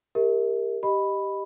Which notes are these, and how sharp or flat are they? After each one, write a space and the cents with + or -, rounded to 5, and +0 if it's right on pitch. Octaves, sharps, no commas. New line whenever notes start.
G4 +25 A#4 -5 E5 -35
G4 +0 D#5 -5 B5 +0